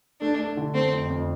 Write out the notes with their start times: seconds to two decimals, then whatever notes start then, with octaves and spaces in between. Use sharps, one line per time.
0.21 A3 D4
0.38 A3
0.57 D3
0.74 A3 C4
0.93 F2
1.10 F2